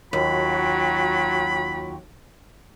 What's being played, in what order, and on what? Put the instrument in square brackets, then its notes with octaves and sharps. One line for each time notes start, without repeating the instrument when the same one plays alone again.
[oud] D#2 [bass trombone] F#3 [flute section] F4 F#4 G5 [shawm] B5